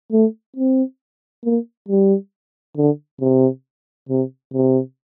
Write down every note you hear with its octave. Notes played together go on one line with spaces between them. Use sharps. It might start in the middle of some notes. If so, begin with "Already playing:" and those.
A3
C4
A#3
G3
D3
C3
C3
C3